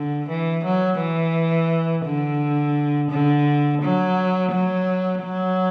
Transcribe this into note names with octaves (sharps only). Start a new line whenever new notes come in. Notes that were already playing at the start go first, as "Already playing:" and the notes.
Already playing: D3
E3
F#3
E3
D3
D3
F#3
F#3
F#3